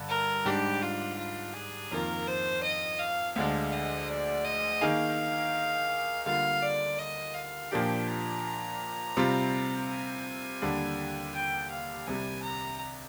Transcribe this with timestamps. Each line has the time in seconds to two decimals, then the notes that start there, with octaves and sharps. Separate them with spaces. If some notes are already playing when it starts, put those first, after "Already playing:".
Already playing: G2 D3
0.09 A#4
0.45 G#2 G3 D4 G4
0.82 F4
1.18 F4
1.54 G#4
1.91 F2 D#3 A#3 F4 A#4
2.27 C5
2.63 D#5
3.00 F5
3.36 D2 D3 G#3 D4 F5
3.72 D#5
4.09 D5
4.44 D#5
4.81 D#3 A#3 D#4 G#4 F5
6.26 D3 G3 A#3 F4 F5
6.63 D5
6.99 D#5
7.34 F5
7.71 A#2 F3 A#3 D4 G4 G5
8.08 A#5
9.17 C3 G3 C4 F4
9.89 G#5
10.62 D#2 D3 G3 D4
11.34 G5
11.71 F5
12.07 C2 C3 G3 G#5
12.43 A#5